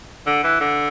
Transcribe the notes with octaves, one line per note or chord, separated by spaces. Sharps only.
D3
E3
D3